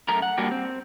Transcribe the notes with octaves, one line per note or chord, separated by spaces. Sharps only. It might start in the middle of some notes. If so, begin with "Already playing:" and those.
F#2 A3 A#4 A#5
F#5
G3 A#3 D4 F#4 G4
C4